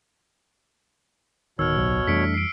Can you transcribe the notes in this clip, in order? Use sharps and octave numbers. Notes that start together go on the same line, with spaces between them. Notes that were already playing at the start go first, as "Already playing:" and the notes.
D1 B2 D#3 C#5 E6 F6
B1
F2 E3 G3 A3 D4 B6 C#7 D7
C7 D7